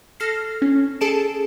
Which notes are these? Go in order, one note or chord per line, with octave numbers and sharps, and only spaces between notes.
A4 F6 A#6 C7
C#4
G#4 A4 A5 D7 E7